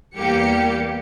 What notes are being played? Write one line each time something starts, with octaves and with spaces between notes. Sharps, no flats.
E2 G3 A#3 G4 C#7